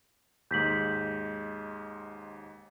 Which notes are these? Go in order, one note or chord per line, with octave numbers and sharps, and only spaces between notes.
D#2 G#2 G6 B6 F#7